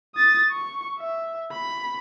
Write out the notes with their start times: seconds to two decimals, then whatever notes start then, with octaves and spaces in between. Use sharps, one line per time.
0.15 D#6 A6
0.51 C#6
0.99 E5
1.51 B5